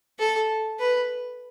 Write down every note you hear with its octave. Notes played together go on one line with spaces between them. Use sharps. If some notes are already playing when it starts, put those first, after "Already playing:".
A4
B4